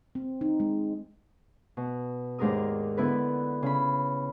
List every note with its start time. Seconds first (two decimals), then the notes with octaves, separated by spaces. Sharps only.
0.15 C4
0.41 D#4
0.60 G#3
1.77 B2
2.39 D#2 G#2 D4 A#4 D#6
2.97 D3 B3 E4 B4
3.63 C#3 B5